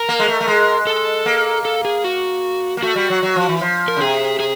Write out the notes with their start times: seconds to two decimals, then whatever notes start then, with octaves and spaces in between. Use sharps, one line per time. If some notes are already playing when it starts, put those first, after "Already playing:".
Already playing: A#4
0.09 A#3
0.19 G#3
0.28 A3
0.41 A3
0.48 G#3
0.87 A4
1.26 A#3
1.65 A4
1.85 G#4
2.04 F#4
2.77 A#3
2.83 A3 F#4
2.95 G3
3.10 F#3
3.23 F#3
3.36 F3
3.49 E3
3.61 F3
3.88 A#4
3.97 C#3
4.00 C3 G#4
4.40 G#4